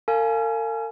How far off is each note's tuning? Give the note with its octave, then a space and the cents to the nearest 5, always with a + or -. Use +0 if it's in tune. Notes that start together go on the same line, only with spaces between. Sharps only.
A#4 -45 F5 -10 G#5 +20